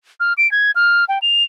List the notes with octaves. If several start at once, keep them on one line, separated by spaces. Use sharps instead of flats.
F6
D7
G#6
F6
G5
F7